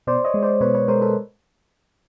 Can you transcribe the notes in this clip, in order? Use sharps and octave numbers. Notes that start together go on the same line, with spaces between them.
B2 C5 D5
C#5 D#5
G#3
C5 D5
B2 B4 C#5
B4 C#5
G#3 A#4 C5
A4 B4